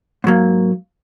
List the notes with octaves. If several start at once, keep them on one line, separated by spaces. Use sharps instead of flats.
G#2 F#3 A#3